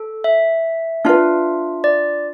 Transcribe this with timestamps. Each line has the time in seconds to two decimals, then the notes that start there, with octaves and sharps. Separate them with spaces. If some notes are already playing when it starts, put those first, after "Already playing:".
Already playing: A4
0.24 E5
1.05 D4 F4 B4
1.84 D5